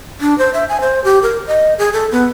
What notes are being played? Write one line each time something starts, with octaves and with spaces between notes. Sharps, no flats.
D4
C5
E5
G#5
C5
G4
A#4
D#5
G#4
A4
B3